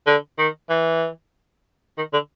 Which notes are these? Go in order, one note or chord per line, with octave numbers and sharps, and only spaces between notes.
D3
D#3
E3
D#3
D3